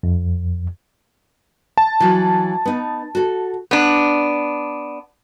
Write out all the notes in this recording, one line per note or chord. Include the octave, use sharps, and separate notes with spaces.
F2
A5
E3 F#3
B3 D#4
F#4 A4
B3 D4